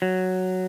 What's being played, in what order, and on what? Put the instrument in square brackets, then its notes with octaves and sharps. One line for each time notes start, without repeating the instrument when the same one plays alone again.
[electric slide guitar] F#3